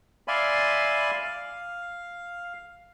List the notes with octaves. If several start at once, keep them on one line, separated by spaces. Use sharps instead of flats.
D5 E5 F5 G#5 B5 C6
F5